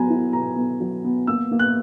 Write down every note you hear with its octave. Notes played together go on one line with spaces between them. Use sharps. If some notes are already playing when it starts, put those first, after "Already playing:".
Already playing: F#3 B3 G#5 A#5
E4
B2 A#5
B3
F#3
B3
A#3 E6
A#3
F#6